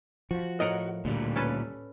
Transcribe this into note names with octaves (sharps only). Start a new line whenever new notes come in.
F3 F#4
A2 A#4 D#5 F#5
D2 A#2 G3
C#4 A4 B4